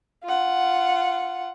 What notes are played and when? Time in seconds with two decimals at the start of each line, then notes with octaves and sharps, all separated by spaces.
0.24 F4 F#5